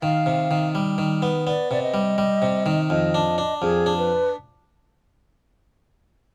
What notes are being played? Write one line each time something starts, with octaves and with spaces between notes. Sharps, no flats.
D#3 F5
C3
D#3
G3
D#3
B3
B3 D5
C3 D5
D#5
G3
G3
C3
D#3
F2 D#5
D4
D4
F2 G#4
D4
B4